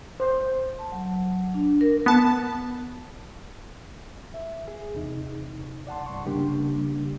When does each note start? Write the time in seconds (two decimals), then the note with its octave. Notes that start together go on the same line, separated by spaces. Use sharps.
0.20 C5
0.79 A5
0.92 F#3
1.54 D4
1.81 A#4
2.06 B3 A5
4.34 E5
4.68 G#4
4.95 E2 C3 D#4
5.87 D5 F#5 A5 C6
6.06 C2 G2 C6 C#6
6.25 C#3 G3 A#3 D4 G4